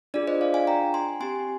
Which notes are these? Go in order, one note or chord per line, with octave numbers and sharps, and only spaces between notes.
D4 F4 G#4 D5
C5 D#5
D5 F5
F5 G#5
G5 A#5
G#5 C6
C4 G4 G#5 C6